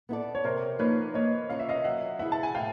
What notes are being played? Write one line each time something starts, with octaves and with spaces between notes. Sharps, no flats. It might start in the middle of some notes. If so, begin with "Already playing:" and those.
B3 E4 A4 D5
C#5
C3 A#4 C5
F3 A#3 D#4 B4 C#5
A#3 C#5 D#5
C#4 F4 A#4 C#5 F5
E5
D#5 F5
F#3 E5 F#5
B3 E4 G#4 E5 F#5
A5
G#5
A2 F5 G5